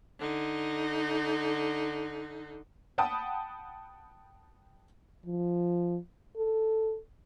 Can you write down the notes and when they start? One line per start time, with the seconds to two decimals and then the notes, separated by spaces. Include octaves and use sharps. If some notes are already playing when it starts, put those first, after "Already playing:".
0.20 D3 D#4
2.98 F#5 G5 A5 B5 D#6
5.26 F3
6.37 A4